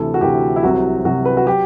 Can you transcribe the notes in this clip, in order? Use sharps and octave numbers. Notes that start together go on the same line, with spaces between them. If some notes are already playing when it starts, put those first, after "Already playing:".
Already playing: D2 C3 E3 A4
F#4
D2 C3 E3 G4
E4
C2 C3 F#3 F#4
C2 C3 F#3 F#4
B4
F#4
F#3 G4